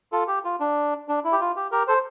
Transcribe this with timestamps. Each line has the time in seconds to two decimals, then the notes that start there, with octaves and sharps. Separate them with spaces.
0.12 F4 A4
0.28 G4
0.45 F4
0.60 D4
1.08 D4
1.24 E4
1.32 G4
1.40 F4
1.56 G4
1.72 G4 A#4
1.88 A4 C5